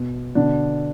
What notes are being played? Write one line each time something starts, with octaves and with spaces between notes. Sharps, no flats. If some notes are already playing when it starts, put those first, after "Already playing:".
Already playing: B2
B2 D3 D4